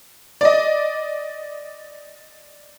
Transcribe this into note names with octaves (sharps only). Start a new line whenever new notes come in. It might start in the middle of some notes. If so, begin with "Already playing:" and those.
D5 D#5